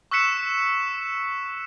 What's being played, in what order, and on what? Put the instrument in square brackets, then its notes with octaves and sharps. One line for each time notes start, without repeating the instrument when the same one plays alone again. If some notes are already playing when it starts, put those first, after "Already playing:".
[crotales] C#6 E6 F#6 B6 C#7 E7